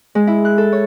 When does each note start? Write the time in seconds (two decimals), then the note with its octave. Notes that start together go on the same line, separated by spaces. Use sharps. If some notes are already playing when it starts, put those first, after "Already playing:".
0.15 G#3
0.27 E4
0.45 F#6
0.58 A4
0.72 C#5